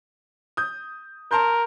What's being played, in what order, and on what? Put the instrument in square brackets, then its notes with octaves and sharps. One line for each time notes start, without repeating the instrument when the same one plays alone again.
[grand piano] D#6 G6
[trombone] A#4 [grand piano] A5 C6 G6